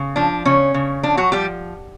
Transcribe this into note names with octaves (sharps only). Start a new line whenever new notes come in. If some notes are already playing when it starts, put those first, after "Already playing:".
Already playing: C#3
F3 D4
C#3 C#4
C#3
F3 D4
F#3 F#4
F3 G3 G4